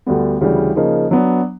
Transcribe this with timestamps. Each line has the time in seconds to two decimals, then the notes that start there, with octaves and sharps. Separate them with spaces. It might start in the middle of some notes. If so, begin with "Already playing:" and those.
0.06 D2 D3 G3 B3
0.41 D2 C#3 E3 G3
0.76 C#3 F3 A#3 D#4
1.11 F#3 B3 D4